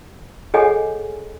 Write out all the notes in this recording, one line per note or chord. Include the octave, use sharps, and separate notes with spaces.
G#4 A4 C#5 D#5 F#5 G#5